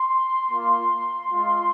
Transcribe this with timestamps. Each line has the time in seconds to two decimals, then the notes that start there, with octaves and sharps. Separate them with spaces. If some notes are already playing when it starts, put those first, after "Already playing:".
Already playing: C6
0.50 A#3 F4
1.30 G#3 F4